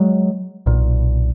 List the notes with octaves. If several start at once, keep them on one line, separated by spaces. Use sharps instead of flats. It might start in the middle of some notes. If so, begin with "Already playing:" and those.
Already playing: F#3 G#3
B1 A#2